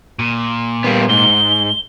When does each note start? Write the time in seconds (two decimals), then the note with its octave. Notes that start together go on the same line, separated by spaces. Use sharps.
0.19 A#2
0.84 G3 A#3 B3
1.09 G#2 G7